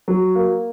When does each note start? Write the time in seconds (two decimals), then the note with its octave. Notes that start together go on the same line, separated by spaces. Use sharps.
0.08 F#3
0.35 A#3